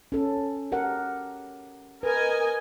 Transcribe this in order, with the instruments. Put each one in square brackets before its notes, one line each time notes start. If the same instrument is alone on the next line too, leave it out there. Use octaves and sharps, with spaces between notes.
[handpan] C#4 A4
G4 A#4 F#5
[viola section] A#4 D#5 G#5 [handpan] B4